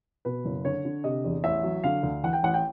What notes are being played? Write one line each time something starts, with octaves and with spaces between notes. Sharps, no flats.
B2 B4
F#1
D3 C#5
D3
C3 D#5
E2
A1 E5
F#3
D3 F5
D2
E3 F#5
G5
A1 F#5
G5